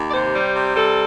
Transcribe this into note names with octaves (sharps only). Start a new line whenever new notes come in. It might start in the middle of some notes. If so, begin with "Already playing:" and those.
Already playing: D#2
D5
C3 C5
G3
C3
G3 A4